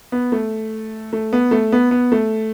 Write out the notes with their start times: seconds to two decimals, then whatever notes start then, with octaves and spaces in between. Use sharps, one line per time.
0.12 B3
0.32 A3
1.13 A3
1.33 B3
1.51 A3
1.72 B3
1.91 B3
2.12 A3